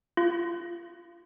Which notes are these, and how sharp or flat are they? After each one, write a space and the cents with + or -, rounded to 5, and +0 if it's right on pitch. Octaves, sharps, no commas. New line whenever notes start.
F4 -25